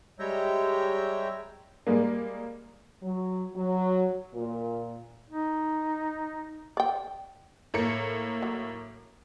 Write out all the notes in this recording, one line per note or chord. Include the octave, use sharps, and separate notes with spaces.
G3 G#3 C#5 E5 G5 A#5
G3 G#3 A#3
F#3
F#3
A#2
D#4
D5 G5
A2 A#3 C#7
F#3